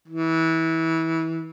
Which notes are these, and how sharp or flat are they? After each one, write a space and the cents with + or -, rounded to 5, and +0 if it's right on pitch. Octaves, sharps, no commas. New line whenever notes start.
E3 -25